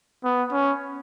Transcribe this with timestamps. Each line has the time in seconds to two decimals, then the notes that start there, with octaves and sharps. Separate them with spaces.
0.24 B3
0.53 C#4